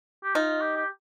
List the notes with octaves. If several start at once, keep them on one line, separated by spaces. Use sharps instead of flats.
G4
D#4 F4
G4
G4